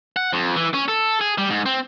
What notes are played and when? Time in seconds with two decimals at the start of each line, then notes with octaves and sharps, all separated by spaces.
0.16 F#5
0.33 F2
0.56 E3
0.74 C#4
0.88 A4
1.21 G#4
1.38 G3
1.50 G#2
1.66 C4